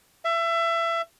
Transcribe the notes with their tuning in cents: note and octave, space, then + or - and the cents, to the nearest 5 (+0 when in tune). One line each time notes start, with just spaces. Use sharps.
E5 +25